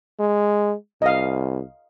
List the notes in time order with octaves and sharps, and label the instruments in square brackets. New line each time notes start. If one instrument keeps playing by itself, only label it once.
[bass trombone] G#3
[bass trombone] C2 [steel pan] D#5 F5